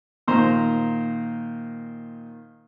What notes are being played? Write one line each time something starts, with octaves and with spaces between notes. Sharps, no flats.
A#2 D#3 C5 A#5